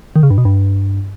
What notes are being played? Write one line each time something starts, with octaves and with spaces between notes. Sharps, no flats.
D#3
C#3
G2
B2
G2